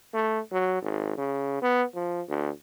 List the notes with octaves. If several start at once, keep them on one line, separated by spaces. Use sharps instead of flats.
A3
F#3
G#1
C#3
B3
F3
D2